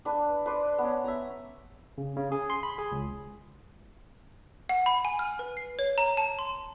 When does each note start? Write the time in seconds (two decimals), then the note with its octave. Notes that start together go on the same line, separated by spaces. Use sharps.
0.05 D4 B4
0.46 B4 C5 D5
0.78 B3 C#4
1.04 E5 A#5
1.98 C#3
2.17 C#3
2.32 G#4
2.50 C6
2.63 B5
2.78 G#4
2.92 C#2
4.69 F#5
4.86 B5
5.05 G#5
5.19 F6
5.39 B4
5.57 C7
5.79 C#5
5.98 A#5
6.17 A5
6.39 C6